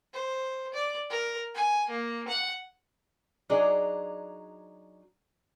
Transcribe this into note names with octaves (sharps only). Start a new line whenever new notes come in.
C5
D5
A#4
G#5
A#3
F#5
F#3 D4 D#4 G#4 D5